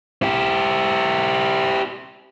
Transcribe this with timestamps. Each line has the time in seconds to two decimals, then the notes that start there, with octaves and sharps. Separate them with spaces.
0.23 E4 G4